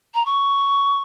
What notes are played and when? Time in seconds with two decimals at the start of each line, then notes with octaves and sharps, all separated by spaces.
0.14 A#5
0.25 C#6